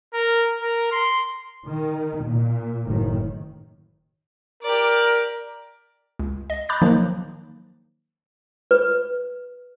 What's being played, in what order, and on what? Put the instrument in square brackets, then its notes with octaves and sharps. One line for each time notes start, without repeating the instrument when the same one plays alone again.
[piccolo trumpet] A#4
A#4
C6
[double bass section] D#3
A#2
F#1 A2 D#3
[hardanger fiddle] G4 D5 [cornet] A#4
[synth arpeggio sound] C#2
D#5
A#5 B5 D6 F#6 G6 A6
D#3 F3 F#3 A#3 D#4
[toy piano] B4